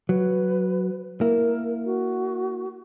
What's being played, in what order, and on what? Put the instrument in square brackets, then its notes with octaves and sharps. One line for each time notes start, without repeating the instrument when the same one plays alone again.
[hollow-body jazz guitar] F#3 [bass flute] B4
[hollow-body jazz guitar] A#3 E4 [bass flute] A#4
[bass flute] F#4